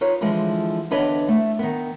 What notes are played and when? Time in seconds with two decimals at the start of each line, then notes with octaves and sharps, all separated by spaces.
0.01 D#4 F4 B4 C#5
0.21 D3 E3 F3 G#3
0.91 E2 D3 D4 B4 C#5 D#5
1.28 A3
1.59 D#3 B3